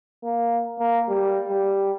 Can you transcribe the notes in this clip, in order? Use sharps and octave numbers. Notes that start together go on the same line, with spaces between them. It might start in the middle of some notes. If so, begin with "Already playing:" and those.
A#3
A#3
G3
G3